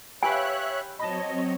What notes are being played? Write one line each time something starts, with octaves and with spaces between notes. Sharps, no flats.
G4 B4 C#5 E5 F5 G#5 F#6
F#3 C4 C#5 D#5 A5 B5